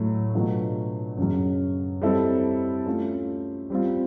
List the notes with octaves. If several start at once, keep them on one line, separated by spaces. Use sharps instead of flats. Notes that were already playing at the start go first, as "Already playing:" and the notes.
Already playing: A2 F#3 A3
B2 F#3 A3 D4 F4
F#2 C#3 F#3
G3 C4 E4 A4
A3 C#4 F4
G3 C4 F4